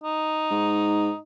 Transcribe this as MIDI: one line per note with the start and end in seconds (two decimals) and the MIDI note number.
0.04 1.18 63
0.50 1.11 44